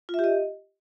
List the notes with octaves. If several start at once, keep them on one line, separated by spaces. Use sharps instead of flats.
F4
E5
G4
D#5